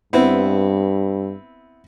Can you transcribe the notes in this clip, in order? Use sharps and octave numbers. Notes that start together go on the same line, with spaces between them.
G2 B3 C4 E4